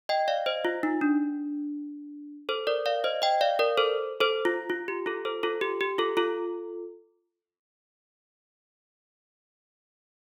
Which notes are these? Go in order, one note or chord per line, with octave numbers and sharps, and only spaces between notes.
D#5 G5
D5 F5
C5 D#5
F4
D#4
D4
A4 C5
A#4 D5
D5 F5
C5 D#5
D#5 G5
D5 F5
A#4 D5
A4 C5
A4 C5
F4
F4
G4
F4 A4
A4 C5
F4 A4
G4
G4
F4 A4
F4 A4